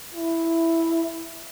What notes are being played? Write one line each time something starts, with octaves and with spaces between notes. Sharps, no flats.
E4